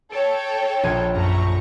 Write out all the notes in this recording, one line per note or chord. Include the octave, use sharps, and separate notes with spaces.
A4 C#5 G5 D7
A#1 G#6 D#7
F#2 A3 A#5 C#6